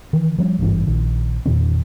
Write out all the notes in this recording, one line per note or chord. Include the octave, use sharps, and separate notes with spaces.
D#3 E3
F3 G3 C#4
G#1 G2 E3 C#4
A#1 D#3
E2 A#2 D#3 C#4